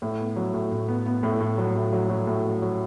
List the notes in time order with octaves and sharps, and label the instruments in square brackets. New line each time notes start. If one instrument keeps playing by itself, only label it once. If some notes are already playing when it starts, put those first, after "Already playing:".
[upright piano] A2
B3
F#3
A2
A2
B3
B3
A2
A2
F#3
A2
F#3
F#3
A2
F#3
F#3